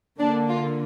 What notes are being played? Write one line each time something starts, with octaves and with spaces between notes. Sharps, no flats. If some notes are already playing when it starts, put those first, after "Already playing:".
D3 A#3 D4
F4